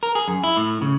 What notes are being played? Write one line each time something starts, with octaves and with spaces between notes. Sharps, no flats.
A#4
G#4
F#2
E4
A2
C#3